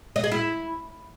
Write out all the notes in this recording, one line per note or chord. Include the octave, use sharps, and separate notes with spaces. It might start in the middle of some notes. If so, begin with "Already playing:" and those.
D#5
G#4
E4